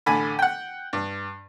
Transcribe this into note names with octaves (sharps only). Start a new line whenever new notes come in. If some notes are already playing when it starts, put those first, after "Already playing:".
A1 D3 G#5 B5
F#5 G5
G2